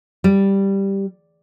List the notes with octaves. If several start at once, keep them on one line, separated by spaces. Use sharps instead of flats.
G3